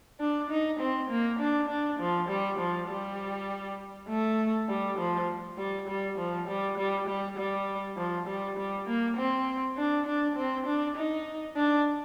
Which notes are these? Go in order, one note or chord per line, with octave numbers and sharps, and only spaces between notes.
D4
D#4
C4
A#3
D4
D4
F3
G3
F3
G3
A3
G3
F3
G3
G3
F3
G3
G3
G3
G3
F3
G3
G3
A#3
C4
D4
D4
C4
D4
D#4
D4